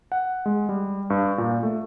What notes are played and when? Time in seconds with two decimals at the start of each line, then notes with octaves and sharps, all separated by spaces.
0.12 F#5
0.46 G#3
0.69 G3
1.10 G2
1.38 A#2
1.63 A3